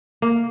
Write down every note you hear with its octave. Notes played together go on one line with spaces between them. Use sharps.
A#3